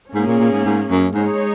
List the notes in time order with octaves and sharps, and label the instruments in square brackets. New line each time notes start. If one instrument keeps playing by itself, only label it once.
[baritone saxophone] G#2 [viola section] A#3 C#4 G#4
[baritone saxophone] A#2
A#2
G#2
G#2
F#2
[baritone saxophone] G#2 [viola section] G#3 D#4 G#4 C#5